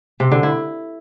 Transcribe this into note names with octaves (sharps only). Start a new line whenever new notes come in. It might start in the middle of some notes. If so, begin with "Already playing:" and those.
C3
D3
E4